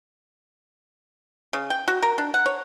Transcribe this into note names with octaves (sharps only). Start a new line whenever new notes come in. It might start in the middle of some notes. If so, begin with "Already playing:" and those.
C#3
G5
F#4
A#4
D4
F#5
C#5